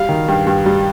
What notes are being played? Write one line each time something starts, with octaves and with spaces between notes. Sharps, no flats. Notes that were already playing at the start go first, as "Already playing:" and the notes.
Already playing: G3 F5
D#3
G2
G2
G3